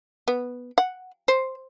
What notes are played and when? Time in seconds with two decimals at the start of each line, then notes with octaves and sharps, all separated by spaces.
0.28 B3
0.78 F#5
1.28 C5